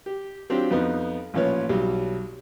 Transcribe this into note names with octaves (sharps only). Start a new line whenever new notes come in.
G4
F#3 C4 D4 F4 G4
F2 B3 D#4
A1 A#2 F3 C#4 B4 C#5
B1 F#3 G3